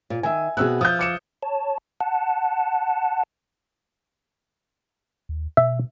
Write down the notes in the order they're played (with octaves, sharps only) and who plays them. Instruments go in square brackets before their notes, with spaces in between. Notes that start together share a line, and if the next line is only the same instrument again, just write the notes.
[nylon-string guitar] A#2
[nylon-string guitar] D#3 E5 [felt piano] G#5
[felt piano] B2 E6 F#6 [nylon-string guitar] B3 C4 G#4
[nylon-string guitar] F3 [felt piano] D#6 G6
[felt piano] D6 C#7 E7
[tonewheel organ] C#5 A5
F#5 A5
[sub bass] D#2
[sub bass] B2 [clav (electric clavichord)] E5